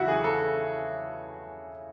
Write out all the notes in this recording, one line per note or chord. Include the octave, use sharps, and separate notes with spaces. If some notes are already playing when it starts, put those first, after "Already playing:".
Already playing: E2 C#3 E3 E4 F#4
G#4
A4